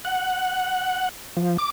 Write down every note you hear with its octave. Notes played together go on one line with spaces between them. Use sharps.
F#5
F3
D6